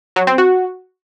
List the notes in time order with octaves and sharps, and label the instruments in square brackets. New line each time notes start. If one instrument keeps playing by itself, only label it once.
[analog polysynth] F#3
C4
F#4